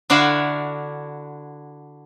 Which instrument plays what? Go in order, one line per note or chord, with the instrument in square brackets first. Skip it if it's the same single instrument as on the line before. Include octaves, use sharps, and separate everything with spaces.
[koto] D3 D4 E4 F#4 E5 F5